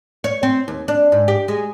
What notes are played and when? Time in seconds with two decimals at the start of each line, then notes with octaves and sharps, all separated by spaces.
0.24 C#5
0.43 C4
0.68 D#2
0.88 D4
1.12 G#2
1.28 G4
1.48 G#3